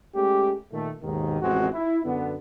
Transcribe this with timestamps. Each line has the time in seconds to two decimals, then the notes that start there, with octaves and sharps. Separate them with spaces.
0.15 G#3 A3 C#4 G4
0.72 A#2 D#3 A3
1.02 D#2 G#2 B2 D#3
1.41 A1 F2 G#3 C4 F#4
1.73 E4
2.05 F#2 D3 B3